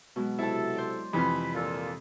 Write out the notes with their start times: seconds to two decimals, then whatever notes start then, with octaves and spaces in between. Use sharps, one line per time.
0.16 B2 F#3 G#3
0.39 C3 E4 A4 A5
0.76 C5 D5
1.13 F2 C3 E3 B5 F6
1.55 A#2 F4 A4